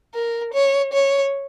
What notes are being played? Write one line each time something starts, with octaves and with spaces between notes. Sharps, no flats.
A#4
C#5
C#5